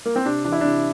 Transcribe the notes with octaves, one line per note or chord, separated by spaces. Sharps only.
A#3
C4
C3 D4
E3 D4
E4
C3 D4